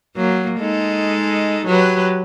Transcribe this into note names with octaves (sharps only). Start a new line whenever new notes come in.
F#3 A#3
G#3 D#4 A4
F#3 G4 B4